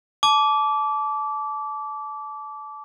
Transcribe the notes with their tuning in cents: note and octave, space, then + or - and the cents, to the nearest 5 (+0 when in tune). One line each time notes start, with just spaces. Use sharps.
A5 -25 D6 -20